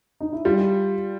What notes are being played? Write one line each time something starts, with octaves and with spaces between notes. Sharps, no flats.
D#4
E4
G3 F4